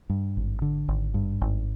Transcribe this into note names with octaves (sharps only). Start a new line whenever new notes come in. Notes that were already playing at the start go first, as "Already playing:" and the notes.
G2
G#1
D3
G#1
G2
G#1